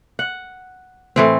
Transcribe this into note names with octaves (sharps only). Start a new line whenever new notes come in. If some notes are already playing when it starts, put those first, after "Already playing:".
F#5
A2 E3 C4